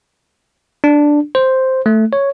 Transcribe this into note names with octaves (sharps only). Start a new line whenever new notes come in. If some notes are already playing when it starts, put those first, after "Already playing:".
D4
C5
A3
C#5